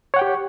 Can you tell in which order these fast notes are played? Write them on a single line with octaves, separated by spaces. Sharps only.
C#5 F#5 G5 G4